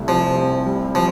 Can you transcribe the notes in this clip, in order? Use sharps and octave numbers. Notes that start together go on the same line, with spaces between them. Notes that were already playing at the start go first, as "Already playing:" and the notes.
Already playing: C2 A3
C3 F3
C4
G3
F3